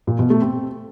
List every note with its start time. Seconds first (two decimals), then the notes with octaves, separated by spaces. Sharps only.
0.07 A#2
0.19 B2
0.30 A3
0.42 C4